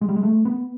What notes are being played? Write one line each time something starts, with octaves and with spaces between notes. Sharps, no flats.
G#3
G3
G#3
A3
B3